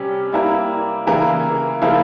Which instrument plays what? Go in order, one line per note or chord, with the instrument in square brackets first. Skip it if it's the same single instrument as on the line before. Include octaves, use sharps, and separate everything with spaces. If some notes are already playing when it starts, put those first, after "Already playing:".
Already playing: [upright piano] C3 G3 C#4
G3 A#3 E4 A#4
C#3 E3 A#3 E4 A#4
C#3 F3 A#3 E4 A#4